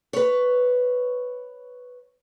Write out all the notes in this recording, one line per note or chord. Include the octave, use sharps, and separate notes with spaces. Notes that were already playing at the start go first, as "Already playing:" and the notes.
B4 C#5